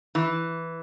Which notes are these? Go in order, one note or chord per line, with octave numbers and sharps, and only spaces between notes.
E3